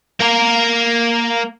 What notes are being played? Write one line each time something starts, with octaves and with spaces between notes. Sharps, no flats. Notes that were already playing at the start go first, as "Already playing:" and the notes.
A#3 A#4